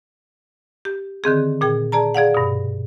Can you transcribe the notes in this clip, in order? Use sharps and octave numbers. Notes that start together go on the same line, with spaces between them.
G4
D3 D#3 C4 G#4
A#2 G#4 G5
G#4 D5 A5 A#5
G#4 D5 F5 F#5
G2 B2